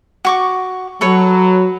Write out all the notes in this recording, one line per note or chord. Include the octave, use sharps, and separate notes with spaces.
F#4 C#6 D6
F#3 A4 B4 C#5